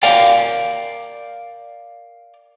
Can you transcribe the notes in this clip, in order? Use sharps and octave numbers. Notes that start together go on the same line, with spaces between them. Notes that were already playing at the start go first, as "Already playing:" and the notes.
A#4 D5 F5 G5